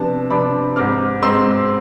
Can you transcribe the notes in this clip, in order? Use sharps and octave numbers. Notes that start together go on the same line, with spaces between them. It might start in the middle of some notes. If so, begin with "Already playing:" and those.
Already playing: C3 F3 B3 D4 A5
C3 F3 B3 D4 B5 D6
G#2 G#3 C4 D6 F6
G#2 G#3 C4 C6 E6